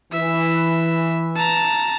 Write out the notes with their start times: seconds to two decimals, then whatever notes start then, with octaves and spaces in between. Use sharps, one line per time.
0.12 E3 E5
1.36 A5 A#5